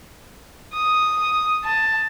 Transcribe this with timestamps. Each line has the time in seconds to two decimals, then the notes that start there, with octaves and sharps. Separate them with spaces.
0.75 D#6
1.65 A5